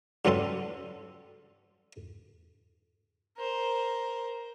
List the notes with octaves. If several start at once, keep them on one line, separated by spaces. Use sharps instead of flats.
G2 F#3 G3 C#4 A4 C6
A#4 C5